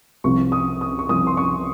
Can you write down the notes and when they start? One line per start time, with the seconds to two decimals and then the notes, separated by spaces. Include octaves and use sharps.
0.24 C2 C3 F3 C#6
0.52 D#6
0.81 D#6
0.99 C#6
1.09 C2 C3 F3 D#6
1.27 C6
1.37 C#6